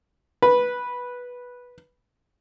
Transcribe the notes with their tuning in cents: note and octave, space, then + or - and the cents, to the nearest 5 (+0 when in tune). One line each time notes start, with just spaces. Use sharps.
B4 -10